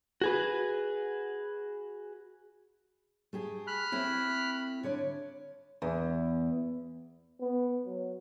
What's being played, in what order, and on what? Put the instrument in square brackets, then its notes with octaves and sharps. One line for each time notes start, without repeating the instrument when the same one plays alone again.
[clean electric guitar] F#4 G#4 B4
[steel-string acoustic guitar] A3 G4 G#4
[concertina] B5 F6 F#6
[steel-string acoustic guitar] A3 C4 E4
D3 C#5 D5
E2
[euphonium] B3
F#3